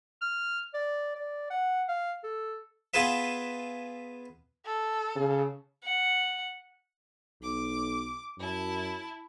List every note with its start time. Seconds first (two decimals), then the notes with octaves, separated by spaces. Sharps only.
0.22 F6
0.74 D5
1.15 D5
1.50 F#5
1.88 F5
2.23 A4
2.94 B3 F4 G#4 B4 E5
4.66 A4
5.16 C#3
5.84 F#5
7.42 B1 D6
8.39 F#2 E4 A5